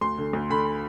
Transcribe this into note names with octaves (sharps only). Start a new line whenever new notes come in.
D2 C6
D3
D2
D3 B5